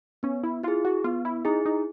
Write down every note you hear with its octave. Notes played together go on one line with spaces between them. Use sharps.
B3 C#4
E4
E4 F4 G#4
F#4
B3 F4
E4
D#4 E4 G#4
D#4